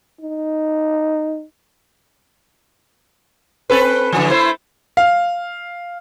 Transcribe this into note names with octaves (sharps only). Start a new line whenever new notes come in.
D#4
C4 A4 B4
D3 E3 F3
A3 E4 C5
F5